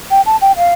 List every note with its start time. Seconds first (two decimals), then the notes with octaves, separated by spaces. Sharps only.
0.11 G5
0.26 A5
0.41 G5
0.57 F5